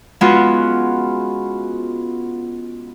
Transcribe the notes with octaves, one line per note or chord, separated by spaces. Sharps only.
G#3 B3 C#4 F4 F#4